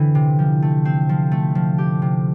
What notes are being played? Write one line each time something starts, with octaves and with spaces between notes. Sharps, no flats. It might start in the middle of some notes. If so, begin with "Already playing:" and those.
Already playing: D3 E3 C4 E4
C3
F3
A3
C4
F3
A3
F3
G4
C3